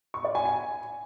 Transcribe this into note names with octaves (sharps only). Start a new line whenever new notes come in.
C#6
D5
G#5
G#5